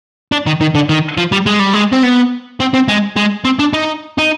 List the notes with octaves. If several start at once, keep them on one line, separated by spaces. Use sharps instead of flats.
D4
D#3
D#3
D3
D#3
F3
G3
G#3
G3
G#3
C4
B3
C4
C4
G#3
G#3
C4
D4
D#4
D#4